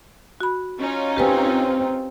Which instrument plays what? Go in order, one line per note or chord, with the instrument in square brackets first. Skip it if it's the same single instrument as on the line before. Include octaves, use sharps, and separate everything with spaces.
[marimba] F#4 B5
[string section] C#4 D#4 F4
[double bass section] C4 [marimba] G4 B4 G#5